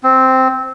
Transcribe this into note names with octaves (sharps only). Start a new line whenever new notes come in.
C4